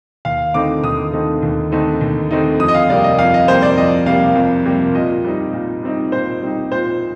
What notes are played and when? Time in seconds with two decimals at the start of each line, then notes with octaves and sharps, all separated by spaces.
0.25 D#2 F5
0.54 D3 A3 C4 D#4 D6
0.83 D#2 D#6
1.13 D3 A3 C4 D#4
1.42 D#2
1.72 D3 A3 C4 D#4
2.01 D#2
2.31 D3 A3 C4 D#4
2.60 F2 D#6
2.68 D#5
2.75 F5
2.90 C3 G3 A#3 D5
3.04 D#5
3.19 F2 F5
3.34 D#5
3.48 C3 G3 A#3 C5
3.62 D5
3.77 F2 D#5
4.06 C3 G3 A#3 F5
4.35 F2
4.66 C3 G3 A#3
4.95 A#2 D#5
5.24 G3 C4 D#4
5.53 A#2
5.83 G3 C4 D#4
6.12 A#2 C5
6.42 G3 C4 D#4
6.72 A#2 C5